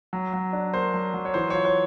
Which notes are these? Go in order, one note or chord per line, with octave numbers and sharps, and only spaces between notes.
F#3
F#3
D4
A#3 C5
F#3
F#3
C#5
E3 C5
F4 C#5
C#5